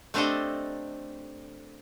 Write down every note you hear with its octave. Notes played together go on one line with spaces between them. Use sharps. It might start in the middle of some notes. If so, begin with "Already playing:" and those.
A3 C4 D4 G4 A4 D#5